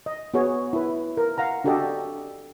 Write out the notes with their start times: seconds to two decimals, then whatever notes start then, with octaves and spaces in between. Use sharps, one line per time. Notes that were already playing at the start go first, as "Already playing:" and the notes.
0.06 D#5
0.34 B3 F#4 G#4 C#5
0.73 E4 B4
1.17 A#4
1.38 F5 F#5 A#5
1.64 D4 F#4 G4 A4 D5 D#5